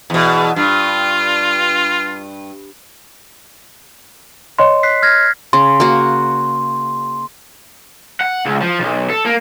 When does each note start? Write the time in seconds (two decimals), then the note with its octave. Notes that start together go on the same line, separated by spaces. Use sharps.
0.10 E2 B2
0.56 G2 F4
4.59 C#5 D#5 C6
4.83 F#6 B6 C7
5.03 F6 G#6 A#6
5.53 C#3 C6
5.80 A#3 F#4
8.20 F#5
8.45 C#2
8.61 F3
8.80 B1
9.10 A4
9.25 A#3